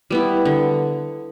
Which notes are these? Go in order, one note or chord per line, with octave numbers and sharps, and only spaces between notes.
G3 B3 E4
D3